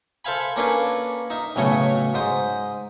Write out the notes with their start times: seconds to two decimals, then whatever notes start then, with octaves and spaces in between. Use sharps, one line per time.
0.25 A4 C5 E5 F5 G#5 B5
0.56 A#3 C#4 D4 A4 B4 G#5
1.30 D#4 E5
1.56 B1 A2 C#3 A3 G#5 C#6
2.14 G#2 C5 D#6